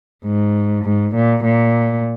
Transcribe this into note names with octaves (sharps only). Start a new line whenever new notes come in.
G#2
G#2
A#2
A#2